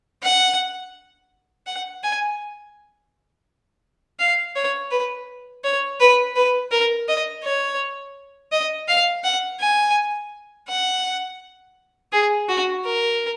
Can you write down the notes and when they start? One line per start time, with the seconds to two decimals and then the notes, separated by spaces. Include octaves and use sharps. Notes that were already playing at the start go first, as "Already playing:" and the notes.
0.23 F#5
1.67 F#5
2.03 G#5
4.19 F5
4.56 C#5
4.91 B4
5.64 C#5
6.00 B4
6.36 B4
6.71 A#4
7.08 D#5
7.44 C#5
8.52 D#5
8.88 F5
9.24 F#5
9.60 G#5
10.69 F#5
12.12 G#4
12.49 F#4
12.85 A#4